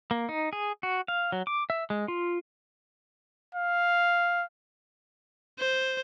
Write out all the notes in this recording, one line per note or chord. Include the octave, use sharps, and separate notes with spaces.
A#3
D#4
G#4
F#4
F5
F#3
D6
E5
G#3
F4
F5
C5